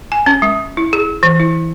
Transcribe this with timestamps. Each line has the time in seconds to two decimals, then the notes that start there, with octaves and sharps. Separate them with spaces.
0.12 G#5
0.26 C#4
0.42 G#3
0.77 E4
0.93 G#4
1.23 E3
1.40 E4